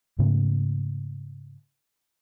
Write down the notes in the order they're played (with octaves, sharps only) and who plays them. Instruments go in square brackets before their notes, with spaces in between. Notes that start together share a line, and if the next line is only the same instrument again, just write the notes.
[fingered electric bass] G#2 C#3 A3 C#4